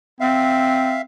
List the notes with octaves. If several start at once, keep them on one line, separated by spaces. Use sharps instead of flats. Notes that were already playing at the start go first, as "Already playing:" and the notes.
C4 E5 F5